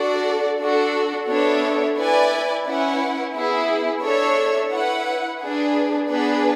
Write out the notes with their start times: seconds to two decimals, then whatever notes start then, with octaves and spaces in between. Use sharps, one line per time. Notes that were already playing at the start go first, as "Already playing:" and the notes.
Already playing: D4 F#4 A4 D5
0.59 D4 F#4 A4
1.28 B3 D4 A4 C#5 E5
1.97 E4 B4 D5 G#5
2.65 C#4 E4 B4 F#5
3.34 B3 E4 G#4
4.02 D4 A4 C#5 E5
4.72 E4 B4 F#5
5.41 D4 G#4 B4
6.09 B3 D4 G#4 B4